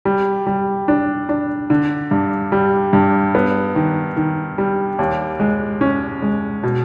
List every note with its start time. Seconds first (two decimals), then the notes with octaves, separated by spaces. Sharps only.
0.05 G3
0.47 G3
0.88 D4
1.29 D4
1.70 D3
2.11 G2
2.52 G3
2.93 G2
3.35 B3
3.75 D#3
4.16 D#3
4.58 G3
4.99 D#2
5.40 G#3
5.81 C#4
6.22 G#3
6.63 B2